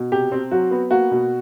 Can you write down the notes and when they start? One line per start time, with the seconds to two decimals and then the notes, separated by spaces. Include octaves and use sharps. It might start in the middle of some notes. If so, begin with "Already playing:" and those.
Already playing: B2
0.12 C3 G4
0.32 C4
0.51 F#3 F#4
0.71 B3
0.91 A#3 F#4
1.11 B2